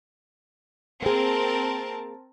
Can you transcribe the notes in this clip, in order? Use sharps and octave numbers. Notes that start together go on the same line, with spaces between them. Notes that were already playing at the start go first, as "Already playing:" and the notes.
A#3 C4 G#4 A#4 A5